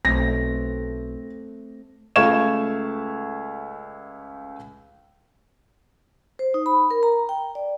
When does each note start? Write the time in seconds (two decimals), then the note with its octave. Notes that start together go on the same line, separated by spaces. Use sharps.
0.05 B1 A3 C4 A#6
2.16 C#2 A3 F5 C#6 G#6 E7
6.39 C5
6.54 D#4
6.66 B5
6.91 A#4
7.03 A#5
7.29 G5
7.55 D5